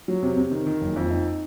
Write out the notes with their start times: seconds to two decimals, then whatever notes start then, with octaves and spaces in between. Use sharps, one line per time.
0.08 F#3
0.23 C3
0.37 C3
0.51 D#3
0.67 D#3
0.81 F#1
0.96 F2
1.11 D#4